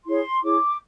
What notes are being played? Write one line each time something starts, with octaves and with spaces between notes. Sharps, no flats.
E4 G#4 C#5 C6
E4 G#4 C#5 D6